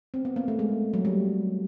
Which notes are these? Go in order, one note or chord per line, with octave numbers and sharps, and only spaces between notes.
C4
B3
A#3
A3
G#3
F#3
G3